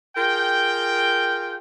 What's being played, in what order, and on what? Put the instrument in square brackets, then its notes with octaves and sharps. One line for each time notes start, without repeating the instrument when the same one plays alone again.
[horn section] F4 G#4 A#4 G5